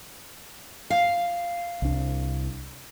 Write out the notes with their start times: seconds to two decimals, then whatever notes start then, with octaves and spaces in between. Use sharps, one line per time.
0.90 F5
1.82 C2 D4